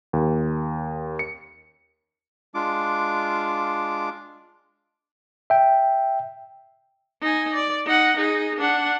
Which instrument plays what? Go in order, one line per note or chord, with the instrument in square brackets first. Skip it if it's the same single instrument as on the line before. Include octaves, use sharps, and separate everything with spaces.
[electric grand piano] D#2
C#7
[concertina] G#3 D4 F4 D6
[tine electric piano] E5 G5
[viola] D#4 G#5
D5
D#4 F#5
D#4 G#4
D4 F#5